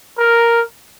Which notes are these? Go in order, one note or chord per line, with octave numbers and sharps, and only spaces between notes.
A#4